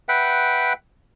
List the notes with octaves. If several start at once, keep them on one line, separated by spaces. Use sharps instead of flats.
B4 E5 F#5 G5